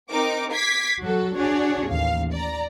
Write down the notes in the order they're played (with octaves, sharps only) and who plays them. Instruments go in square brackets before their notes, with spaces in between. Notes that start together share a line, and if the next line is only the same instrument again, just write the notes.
[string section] C4 D#4 A#4 D6
D6 G#6 B6 C7
F#3 F#4 A4
D4 F#4 G#4 C#5 D5
A1 D#2 F5
D5 A#5